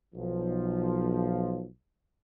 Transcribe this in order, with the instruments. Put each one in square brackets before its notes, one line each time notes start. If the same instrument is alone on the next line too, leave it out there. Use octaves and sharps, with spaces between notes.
[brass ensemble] B1 F3